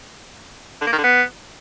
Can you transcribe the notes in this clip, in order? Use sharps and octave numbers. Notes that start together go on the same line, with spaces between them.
D3
A#3
D#3
D3
B3